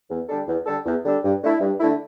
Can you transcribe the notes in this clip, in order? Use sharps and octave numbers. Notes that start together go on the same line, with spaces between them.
E2
D3 G3 D4 A4
E2
D3 G3 D4 A4
E2
D3 G3 D4 A4
G2
D3 A3 E4
G2
D3 A3 E4